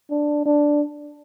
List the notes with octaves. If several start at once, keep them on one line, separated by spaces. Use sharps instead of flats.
D4
D4